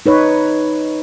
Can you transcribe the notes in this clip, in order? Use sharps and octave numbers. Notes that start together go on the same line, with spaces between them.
D#4 B4 C#5